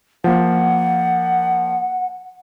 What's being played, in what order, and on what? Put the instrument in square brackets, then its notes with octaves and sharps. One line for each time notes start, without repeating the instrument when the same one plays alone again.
[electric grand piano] F3 A#3 [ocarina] F#5